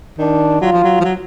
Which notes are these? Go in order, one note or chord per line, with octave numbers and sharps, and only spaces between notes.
D#3 D4
F#3 F4
F3
F#3
F3
F#3